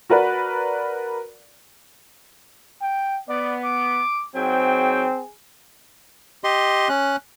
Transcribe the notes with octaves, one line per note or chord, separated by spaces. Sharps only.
F#4 A#4 B4 D5
G5
B3 D5
D6
G#2 F#3 C4 G#4 G5
G4 D#5 C6
C#4 F#6